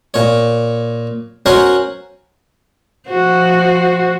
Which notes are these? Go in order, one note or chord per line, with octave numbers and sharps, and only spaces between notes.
A#2 C#5
C#4 F#4 A#4 C5 C#5
F3 F#4 C5